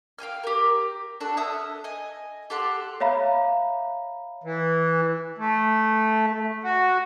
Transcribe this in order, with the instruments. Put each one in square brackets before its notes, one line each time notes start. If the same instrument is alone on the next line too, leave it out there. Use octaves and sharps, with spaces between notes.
[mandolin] F5 G5 G#5 F6
G4 A#4
D4 F#4 A4
A4 E5 D#6 F6
D#5 G#5
G4 A4 F#5 C6
[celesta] C#5 E5 F5 A#5 B5
[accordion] E3
A3
F#4